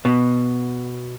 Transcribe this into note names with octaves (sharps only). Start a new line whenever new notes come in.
B2